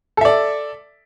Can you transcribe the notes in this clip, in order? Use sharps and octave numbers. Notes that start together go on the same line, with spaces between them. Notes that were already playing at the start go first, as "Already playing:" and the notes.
A4 D5 E5